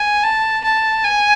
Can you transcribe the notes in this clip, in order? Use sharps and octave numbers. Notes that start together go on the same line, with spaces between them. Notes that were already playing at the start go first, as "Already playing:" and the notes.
Already playing: G#5
A5
A5
G#5